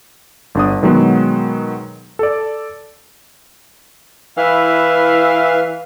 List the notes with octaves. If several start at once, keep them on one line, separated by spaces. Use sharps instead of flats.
G1 D4 D#6
B2 D#3 F#3 G#3 B3
A4 D5
E3 E4 B4 E5 F5